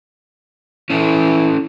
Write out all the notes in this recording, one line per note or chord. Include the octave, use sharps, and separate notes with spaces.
E3 C#4 E4 A4